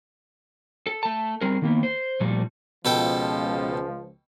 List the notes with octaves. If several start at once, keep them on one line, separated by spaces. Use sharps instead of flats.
A4
A3 A5
G3 C4 G#4 A#4
D#3 A#3 B3
C5
A#2 F3 G3 A3
C#2 B2 F3 A4 G5